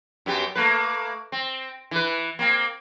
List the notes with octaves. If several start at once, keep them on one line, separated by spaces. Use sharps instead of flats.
F#2 B3 G4
A3 A#3 B4
C4
E3 B4
A#3 C4